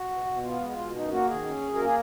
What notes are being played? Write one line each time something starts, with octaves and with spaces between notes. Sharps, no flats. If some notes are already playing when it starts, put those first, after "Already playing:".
Already playing: F#4
B2
B2
B3 F4
G#3
F4
B2
F#2 D#4
A#3 F#4
D#3 G#4
C#4
F#2
A#3 A#4
G#4